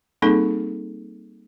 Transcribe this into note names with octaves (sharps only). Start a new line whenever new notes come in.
G3 A#3 C4 D#4 G#4 A4